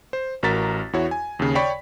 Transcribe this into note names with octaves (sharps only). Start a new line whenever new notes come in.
C5
A1 F#4 A#4 A#5 A6 B6
E2 E4 F#4 C#5
G#5
D#2 C#3
C#5 D5 G5 B5 C#6 B6